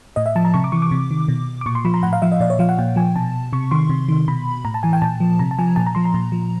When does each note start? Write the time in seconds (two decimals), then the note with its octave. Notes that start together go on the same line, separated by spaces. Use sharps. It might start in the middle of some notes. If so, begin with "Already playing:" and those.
0.16 A2 D#5
0.26 E5
0.36 F3 A5
0.45 A#5
0.54 C3 C#6
0.64 D6
0.72 E3 C#6
0.82 D6
0.91 C3
1.11 D#3
1.28 B2
1.61 D6
1.66 A#2 C#6
1.75 C6
1.85 F3 B5
1.94 A#5
2.03 A2 F#5
2.13 F5
2.22 F3 E5
2.32 D#5
2.40 A#2 D5
2.50 C#5
2.59 F3 F5
2.69 F#5
2.79 A#2 G5
2.96 F3 G#5
3.16 B2 A5
3.53 C3 C#6
3.71 D#3 C6
3.90 C3
4.09 D#3
4.28 B2 B5
4.65 A2 A#5
4.74 A5
4.83 E3 G#5
4.93 G5
5.02 A#2 A5
5.20 F3
5.39 C3 A#5
5.51 A5
5.59 F3 G#5
5.76 A#2 A5
5.86 A#5
5.95 F3 C6
6.05 A#5
6.14 A#2
6.32 F3